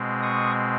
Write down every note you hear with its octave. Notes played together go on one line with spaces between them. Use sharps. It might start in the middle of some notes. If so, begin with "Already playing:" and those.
Already playing: B2 G#3 C4
C#6 D#6